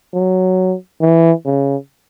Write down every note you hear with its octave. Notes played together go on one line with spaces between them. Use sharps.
F#3
E3
C#3